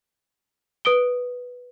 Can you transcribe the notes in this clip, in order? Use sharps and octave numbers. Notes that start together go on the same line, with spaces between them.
B4 D#6 D7 G7